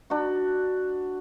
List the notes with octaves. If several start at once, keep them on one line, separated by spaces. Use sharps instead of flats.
D4 F#4